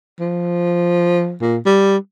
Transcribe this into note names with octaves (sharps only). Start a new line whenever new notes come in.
F3
A#2
G3